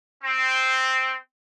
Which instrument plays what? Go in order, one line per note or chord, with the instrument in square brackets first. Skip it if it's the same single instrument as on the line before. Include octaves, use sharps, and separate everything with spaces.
[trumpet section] C4